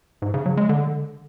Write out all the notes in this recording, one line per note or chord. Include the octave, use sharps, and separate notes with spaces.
G#2
C#3
F#3
G#3
D3